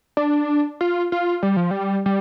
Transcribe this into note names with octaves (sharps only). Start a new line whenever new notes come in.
D4
F4
F4
G3
F3
G3
G3